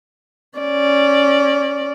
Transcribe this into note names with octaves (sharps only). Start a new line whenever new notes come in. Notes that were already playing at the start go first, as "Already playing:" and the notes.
C#4 D5